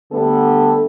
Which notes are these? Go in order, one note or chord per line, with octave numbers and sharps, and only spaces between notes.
D3 G3 A3 B3 A4